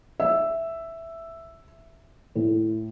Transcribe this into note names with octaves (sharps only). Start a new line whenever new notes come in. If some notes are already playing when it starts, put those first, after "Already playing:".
E5
A2